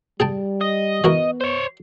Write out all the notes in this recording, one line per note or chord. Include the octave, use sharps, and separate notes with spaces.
G3 G#4 G5 A5
D#5
E3 B3 F#4 A#4
C5 C#5